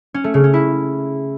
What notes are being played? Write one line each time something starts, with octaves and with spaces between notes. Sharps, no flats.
C#4
A3
C#3
C#4
E4